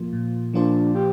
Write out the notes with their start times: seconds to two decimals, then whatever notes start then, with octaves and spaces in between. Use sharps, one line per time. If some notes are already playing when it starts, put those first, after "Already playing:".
Already playing: A#2 F3 A#3 F4
0.13 A#2
0.53 F3 A#3 D4 F4 C5
0.95 G4